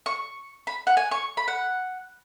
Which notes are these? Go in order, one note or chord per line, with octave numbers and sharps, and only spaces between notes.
C#6
B5
F#5
G#5
C#6
B5
F#5